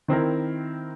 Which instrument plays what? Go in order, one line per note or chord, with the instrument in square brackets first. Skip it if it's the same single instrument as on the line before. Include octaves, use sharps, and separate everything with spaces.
[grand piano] D#3 C4 E4 A#4